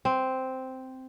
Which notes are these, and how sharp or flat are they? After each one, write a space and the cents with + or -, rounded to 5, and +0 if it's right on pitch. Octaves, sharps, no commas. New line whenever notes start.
C4 -5